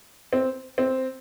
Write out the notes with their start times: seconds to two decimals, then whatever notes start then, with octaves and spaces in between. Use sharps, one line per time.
0.33 C4
0.78 C4